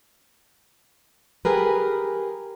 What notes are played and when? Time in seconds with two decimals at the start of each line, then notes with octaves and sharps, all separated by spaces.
1.45 G4 G#4 A#4 B4